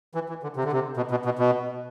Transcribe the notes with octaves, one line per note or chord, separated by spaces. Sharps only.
E3
E3
D3
C3
D3
C3
B2
B2
B2
B2